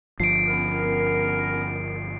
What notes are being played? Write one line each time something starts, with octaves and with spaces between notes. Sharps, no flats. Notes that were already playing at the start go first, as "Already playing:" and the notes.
G1 F3 C7 D7
B3 C#4 A#4